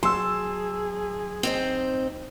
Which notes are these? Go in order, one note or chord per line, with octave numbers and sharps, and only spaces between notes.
F#3 G#4 A5 C6 E6
C4 D#4 C5